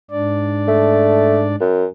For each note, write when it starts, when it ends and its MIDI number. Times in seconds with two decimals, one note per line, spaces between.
0.11 1.56 44
0.11 1.56 62
0.11 1.56 74
0.68 1.45 57
1.61 1.86 42